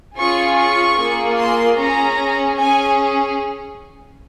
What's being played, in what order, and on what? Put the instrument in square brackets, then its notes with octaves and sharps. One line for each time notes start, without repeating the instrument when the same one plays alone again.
[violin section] C#4 F4 G#4 C#6
C#6
A#3 F4 G#4
C6
C#4 G#4 A#5
C#4 G#4 G#5